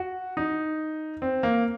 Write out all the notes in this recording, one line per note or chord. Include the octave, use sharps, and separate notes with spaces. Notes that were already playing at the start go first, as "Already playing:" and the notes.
Already playing: F#4
D#4
C4
A#3